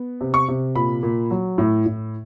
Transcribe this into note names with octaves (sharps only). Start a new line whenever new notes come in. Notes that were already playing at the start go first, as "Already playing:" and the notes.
Already playing: B3
C3
C#6
C3
A#2 B5
A#2
F#3
A2
A2